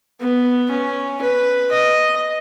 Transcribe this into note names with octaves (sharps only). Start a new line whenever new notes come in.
B3
C#4
B4
D#5